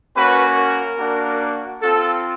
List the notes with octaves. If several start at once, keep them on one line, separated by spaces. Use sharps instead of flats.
A#3 C#4 F#4 B4
A#4
A#3 D4 F#4
C4 F4 A4